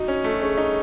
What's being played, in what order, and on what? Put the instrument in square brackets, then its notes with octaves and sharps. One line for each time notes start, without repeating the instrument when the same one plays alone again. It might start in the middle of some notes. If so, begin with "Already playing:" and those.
Already playing: [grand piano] D#4 [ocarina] F#4
[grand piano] C#4
A3
[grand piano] C#4 [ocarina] G#4
[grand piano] D#4